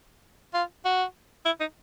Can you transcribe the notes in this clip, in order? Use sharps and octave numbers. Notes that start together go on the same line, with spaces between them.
F4
F#4
E4
D#4